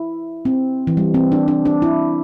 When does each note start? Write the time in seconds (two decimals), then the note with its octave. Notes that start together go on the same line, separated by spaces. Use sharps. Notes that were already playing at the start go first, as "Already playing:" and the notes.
Already playing: E4
0.45 C4
0.87 E3
0.97 G3
1.14 C4
1.32 D4
1.48 D4
1.65 D4
1.82 E4